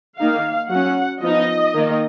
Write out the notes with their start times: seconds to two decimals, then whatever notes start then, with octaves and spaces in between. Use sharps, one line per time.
0.18 D#3 A#3 D#4 F5
0.70 F#3 C#4 F#5
1.22 F3 B3 D#4 D#5
1.73 D#3 A#3 D#4